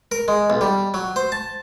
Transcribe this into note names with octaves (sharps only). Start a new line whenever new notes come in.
A#4
G#3
B1
G3
F#3
C5
A5